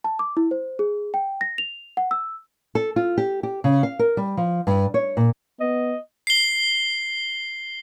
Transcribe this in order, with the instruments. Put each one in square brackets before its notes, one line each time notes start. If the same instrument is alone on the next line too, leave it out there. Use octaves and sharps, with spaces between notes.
[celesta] A5
D6
E4
C5
G#4
G5
A#6
F7
F#5
E6
[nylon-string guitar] A4
F4
G4
G4
C#3
F5
A#4
G3
F3
G2
C#5
A#2
[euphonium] B3 [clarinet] D#5
[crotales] C7 G7